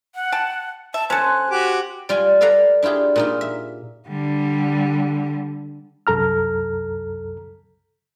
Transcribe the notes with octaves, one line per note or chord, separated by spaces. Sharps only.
F#5
G5 A5
E5 A5
C#4 A4 C5 G#5 F#6
F#4 G4
G3 F4 D5 G#5
A4 B4 D5 F5 F#5 A#5
D4 E4 F4 G4 G#4
A#2 D#4 F4
E5
D3 G3
C2 F#2 A4 A#5 F6